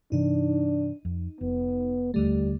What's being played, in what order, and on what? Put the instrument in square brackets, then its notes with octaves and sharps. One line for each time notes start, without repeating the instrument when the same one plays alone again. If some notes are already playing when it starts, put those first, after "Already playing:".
[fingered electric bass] G2 C3 E3 [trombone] D4 [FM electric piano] D#4
[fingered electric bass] F2
[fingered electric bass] F1 [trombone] B3
[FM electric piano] D#2 D3 A3 [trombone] G3